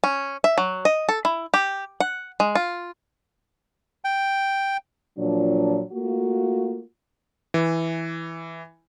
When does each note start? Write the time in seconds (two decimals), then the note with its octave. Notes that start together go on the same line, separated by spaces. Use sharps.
0.04 C#4
0.44 E5
0.58 F#3
0.85 D#5
1.09 A4
1.25 E4
1.54 G4
2.00 F#5
2.40 G#3
2.55 F4
4.04 G5
5.17 A#2 F3 F#3 D4
5.93 A3 A#3 F4 F#4
7.54 E3